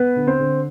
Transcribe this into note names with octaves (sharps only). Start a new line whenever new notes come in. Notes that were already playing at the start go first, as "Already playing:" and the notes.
Already playing: B3 B4
D3
C4 C5
D3